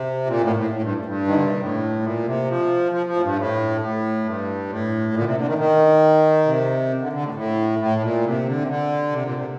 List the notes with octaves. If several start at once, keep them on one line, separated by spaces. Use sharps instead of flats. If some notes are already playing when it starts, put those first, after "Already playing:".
Already playing: C3
A#2
A2
A2
A2
G2
G2
D#3
D3
C3
A#2
A2
A#2
C3
F3
F3
F3
A2
G2
A2
A2
G2
A2
A#2
D3
C3
D3
D#3
D#3
C3
D3
D3
A2
A2
A2
A#2
C3
D3
C3
D3
C3
A#2
C3